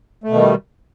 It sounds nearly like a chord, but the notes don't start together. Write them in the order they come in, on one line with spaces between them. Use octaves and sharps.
A3 B2 D#3 G3